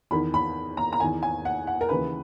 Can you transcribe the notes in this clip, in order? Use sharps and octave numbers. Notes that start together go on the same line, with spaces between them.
E2 D#3 B5
B5
A#5
A#5
E2 D#3 G#5
G#5
F#5
F#5
A#4
D#2 C#3 E3 B4